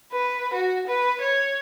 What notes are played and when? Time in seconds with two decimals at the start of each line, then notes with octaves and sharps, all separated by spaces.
0.13 B4
0.53 F#4
0.88 B4
1.21 C#5